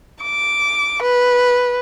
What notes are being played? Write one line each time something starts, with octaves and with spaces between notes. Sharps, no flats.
D6
B4